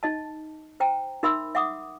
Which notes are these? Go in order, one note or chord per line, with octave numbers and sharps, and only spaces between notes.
D#4 D#5 A5
C5 G5 A#5
D#4 A#4 E5 B5 C6 E6
E5 F#5 D6 D#6